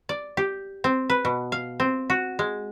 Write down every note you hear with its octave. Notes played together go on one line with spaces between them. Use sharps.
D5
G4
C4
B4
B2
F5
C4
F#4
G#3